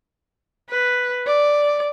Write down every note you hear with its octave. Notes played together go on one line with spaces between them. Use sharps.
B4
D5